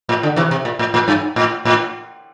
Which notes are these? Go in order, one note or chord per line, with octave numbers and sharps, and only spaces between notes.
A2
D3
C3 E3
C3
A#2
A2
A2
G2
A2
A2